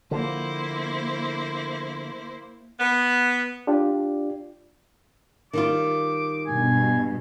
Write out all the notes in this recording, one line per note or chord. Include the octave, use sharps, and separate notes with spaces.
D3 F3 A#3 E4 C5
B3
D4 F4 G4 D5
D#3 G3 F4 D6
G2 B2 G#5